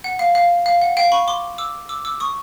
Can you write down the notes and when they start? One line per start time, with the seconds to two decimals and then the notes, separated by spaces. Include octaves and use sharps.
0.04 F#5
0.19 F5
0.35 F5
0.66 F5
0.81 F#5
0.97 F5 G5
1.12 B5 C#6
1.28 C6 D6
1.58 D6 E6
1.89 D6 E6
2.05 D6 E6
2.20 C#6 D#6